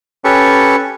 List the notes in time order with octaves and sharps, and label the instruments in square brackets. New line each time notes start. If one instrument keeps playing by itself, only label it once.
[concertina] C#4 G4 A4 B4 C#6